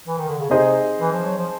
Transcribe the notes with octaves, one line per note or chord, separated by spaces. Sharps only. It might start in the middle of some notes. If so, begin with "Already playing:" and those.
E3
D#3
D3
C#3
C3 C4 D#4 G#4 C5 D#5
E3
F3
F#3
F3